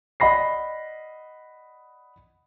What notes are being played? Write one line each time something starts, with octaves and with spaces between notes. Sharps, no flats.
D5 D#5 F#5 B5 A#6 C7